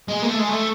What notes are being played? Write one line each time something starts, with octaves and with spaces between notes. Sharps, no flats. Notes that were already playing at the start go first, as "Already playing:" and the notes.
G#3
A#3
A3
G#3
A3